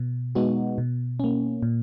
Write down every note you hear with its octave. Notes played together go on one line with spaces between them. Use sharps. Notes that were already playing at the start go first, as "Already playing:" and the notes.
Already playing: B2
G#3 B3 D#4 F#4
B2
A#3 C#4
A#2